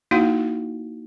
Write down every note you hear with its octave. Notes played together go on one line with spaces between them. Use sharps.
A#3 D#4 E4 F#4 F5